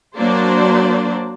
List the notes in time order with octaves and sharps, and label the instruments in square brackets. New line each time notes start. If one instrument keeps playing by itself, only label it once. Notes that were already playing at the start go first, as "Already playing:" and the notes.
[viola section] F#3 A#3 D4 C5 D5